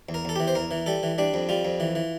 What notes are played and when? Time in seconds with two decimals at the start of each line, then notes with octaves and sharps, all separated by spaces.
0.09 E2
0.14 A#4
0.25 E2 A4
0.36 E3 G4
0.48 C5
0.55 E2 A#4
0.71 E3
0.86 G3 A4
1.03 E3
1.18 G3 D4
1.34 F2
1.49 G3 F4
1.65 F2
1.80 E3
1.95 E3